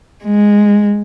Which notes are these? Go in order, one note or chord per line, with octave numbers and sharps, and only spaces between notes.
G#3